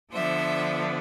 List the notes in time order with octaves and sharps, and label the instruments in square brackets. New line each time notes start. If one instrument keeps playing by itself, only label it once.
[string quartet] D3 F3 B3 D4 C5 E5